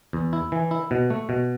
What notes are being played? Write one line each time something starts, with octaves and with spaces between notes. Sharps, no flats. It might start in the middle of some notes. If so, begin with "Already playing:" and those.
E2
E4
E3
E4
B2
A3
B2